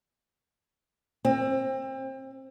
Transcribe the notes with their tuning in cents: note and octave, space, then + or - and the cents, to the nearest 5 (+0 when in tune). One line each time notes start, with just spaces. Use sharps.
C4 +30